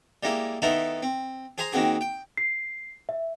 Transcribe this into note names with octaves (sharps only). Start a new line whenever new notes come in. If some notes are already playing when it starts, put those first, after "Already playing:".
G3 G#3 A#3 E4
D#3 A3 B3 D#4 E4 A4
C4
G#4 C5 G#5 A#5 C6
D#3 A#3 C4 F#4 G#4
G5
C7
E5